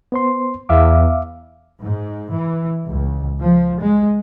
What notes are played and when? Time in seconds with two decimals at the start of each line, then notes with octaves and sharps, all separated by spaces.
0.12 B3 C5 C6
0.69 E2 E5 F5 D6
1.81 G#2
2.32 E3
2.88 C#2
3.41 F3
3.81 G#3